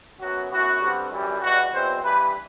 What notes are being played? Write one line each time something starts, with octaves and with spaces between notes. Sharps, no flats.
F#2 F#3 B3 F#4
F#2 E3 B3 F#4
G2 D3 G3 C4
F#2 E3 G3
E2 B2 G3 F#4
E2 B2 F#3 C4 C5
G2 E3 G3 B4